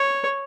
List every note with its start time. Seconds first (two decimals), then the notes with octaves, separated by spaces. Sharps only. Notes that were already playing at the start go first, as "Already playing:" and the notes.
Already playing: C#5